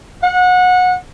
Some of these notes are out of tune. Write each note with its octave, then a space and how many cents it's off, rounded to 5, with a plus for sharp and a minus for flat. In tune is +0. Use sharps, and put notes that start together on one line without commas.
F#5 -25